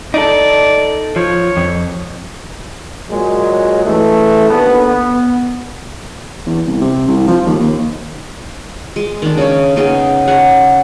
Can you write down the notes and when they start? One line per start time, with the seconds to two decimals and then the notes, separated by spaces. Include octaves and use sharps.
0.14 D#4 A4 D5
1.16 F3 C#5
1.57 F2
3.09 A#2 F#3 G#3
3.85 C#3 E3 A3
4.50 D#2 D3 B3
4.86 B3
6.46 E2
6.66 C2
6.81 C3
7.08 C2
7.27 F3
7.46 D#2
7.60 D#2
8.96 G#3
9.22 D#3 D4
9.37 C#3 C#5
9.76 C#3 B3 D#4 G#4
10.28 G#4 C#5 F#5